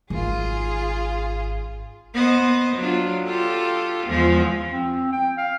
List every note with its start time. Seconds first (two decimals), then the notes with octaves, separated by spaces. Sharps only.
0.10 G#1 F4 G#4
2.14 B3 C5 D#5
2.76 F#3 D4 F4
3.25 F4 G4 A4
4.07 E2 F3 G#3
4.71 C4
5.12 G5
5.38 F5